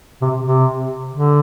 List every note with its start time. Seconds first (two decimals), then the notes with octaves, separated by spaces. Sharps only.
0.22 C3
0.44 C3
1.14 D3